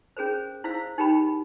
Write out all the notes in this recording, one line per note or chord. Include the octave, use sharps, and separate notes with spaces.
C#4 G#4 A#4 C5
E4 C5 F5 E6
D#4 G4 A#4 G5 B5